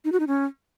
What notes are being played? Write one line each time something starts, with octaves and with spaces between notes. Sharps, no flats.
D#4
F#4
D#4
C#4